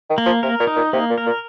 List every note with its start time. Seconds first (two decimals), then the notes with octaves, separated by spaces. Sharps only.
0.10 D#3
0.18 A#3
0.26 F3
0.43 C3 A#4
0.60 A#2
0.67 D#4
0.76 A#2
0.93 C3 A#3
1.10 A#2
1.18 A#4
1.26 A#2